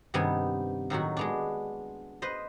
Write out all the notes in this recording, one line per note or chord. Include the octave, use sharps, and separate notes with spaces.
G2 C3 D#3 B3 G#5
A2 D#3 F#3 F#4
G#3 B3 D4
B4 C5 D#5